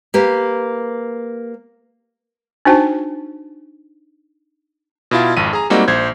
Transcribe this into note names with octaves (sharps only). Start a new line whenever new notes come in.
A#3 G4 B4
D4 D#4 F#4 C5 G5 A5
B2 E4 F4
G#1 F2 D#7
G#4 A#5
G3 G#3 A#3 C4 D#4 F#4
A#1 C5 G#6